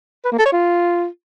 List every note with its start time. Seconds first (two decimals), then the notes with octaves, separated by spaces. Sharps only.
0.25 B4
0.32 A#3
0.39 A4
0.46 C#5
0.52 F4